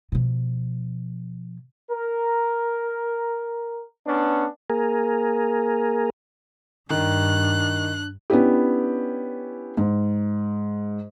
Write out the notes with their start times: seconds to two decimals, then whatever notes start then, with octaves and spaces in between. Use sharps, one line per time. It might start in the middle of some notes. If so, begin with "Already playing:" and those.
0.12 B2 F3
1.91 A#4
4.06 B3 C#4 D4
4.70 A#3 G#4 A#4
6.90 G2 D#3 D4 F#6
8.30 B3 C#4 D4 E4 G4
9.77 G#2